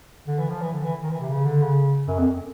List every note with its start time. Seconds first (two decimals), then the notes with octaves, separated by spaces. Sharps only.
0.28 D3
0.39 E3
0.50 F3
0.61 E3
0.72 D3
0.83 E3
1.04 D#3
1.11 E3
1.20 C3
1.29 C#3
1.45 D3
1.62 C#3
2.07 F#2
2.19 F2